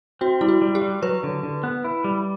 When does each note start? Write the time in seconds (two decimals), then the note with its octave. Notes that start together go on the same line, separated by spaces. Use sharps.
0.21 C4 F#4
0.41 G3 E4
0.49 F#4
0.62 G3
0.75 G4
0.82 G3
1.02 F#3 B4
1.23 D3
1.43 D3
1.63 B3
1.84 E4
2.04 G3